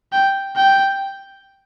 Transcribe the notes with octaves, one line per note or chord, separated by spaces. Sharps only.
G5
G5